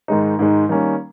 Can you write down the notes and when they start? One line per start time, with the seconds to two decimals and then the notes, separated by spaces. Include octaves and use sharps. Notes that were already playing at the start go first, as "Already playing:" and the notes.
0.08 G#2 D#3 G#3 D#4
0.39 G#2 D#3 G#3 D#4
0.69 D#3 G3 A#3 C#4